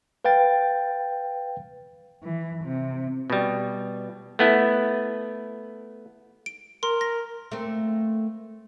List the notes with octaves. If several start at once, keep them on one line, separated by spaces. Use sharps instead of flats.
B4 F5 G5 A6
E3
C3
B2 G3
A3 B3 E4
D7
A#4 C6
A#6
A3 A#3 C4